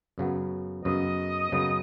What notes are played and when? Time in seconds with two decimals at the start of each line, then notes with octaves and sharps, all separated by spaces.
0.18 F#2 C#3 F#3 B3
0.85 F#2 C#3 F#3 B3 D#5
1.52 F#2 C#3 F#3 B3